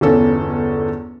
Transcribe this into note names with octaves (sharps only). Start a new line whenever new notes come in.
G1 E2 C#4 A4